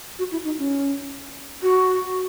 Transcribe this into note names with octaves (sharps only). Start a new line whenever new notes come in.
F#4
E4
D#4
C#4
F#4